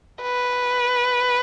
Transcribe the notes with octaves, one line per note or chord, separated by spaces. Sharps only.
B4